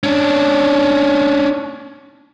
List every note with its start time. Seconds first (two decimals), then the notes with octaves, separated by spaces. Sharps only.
0.03 C#4 D4